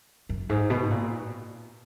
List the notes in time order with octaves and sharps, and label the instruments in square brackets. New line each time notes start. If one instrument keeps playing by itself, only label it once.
[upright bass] F#2
G#2
B2
A#2